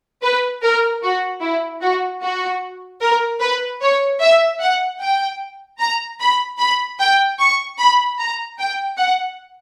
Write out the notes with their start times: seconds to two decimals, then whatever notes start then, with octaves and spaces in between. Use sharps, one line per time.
0.22 B4
0.62 A#4
1.03 F#4
1.42 E4
1.81 F#4
2.21 F#4
3.01 A#4
3.40 B4
3.81 C#5
4.21 E5
4.61 F#5
5.00 G5
5.79 A#5
6.20 B5
6.59 B5
7.00 G5
7.39 C#6
7.78 B5
8.18 A#5
8.59 G5
8.98 F#5